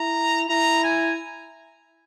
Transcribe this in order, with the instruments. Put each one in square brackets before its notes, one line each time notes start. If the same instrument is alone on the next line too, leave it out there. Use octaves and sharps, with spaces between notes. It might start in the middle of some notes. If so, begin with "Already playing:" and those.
Already playing: [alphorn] E4 [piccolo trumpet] A#5
[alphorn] E4 [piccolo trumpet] A#5
[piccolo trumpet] G#5